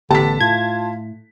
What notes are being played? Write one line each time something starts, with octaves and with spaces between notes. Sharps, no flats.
A1 D3 B3 G4 A5 B6
A2 F4 G#6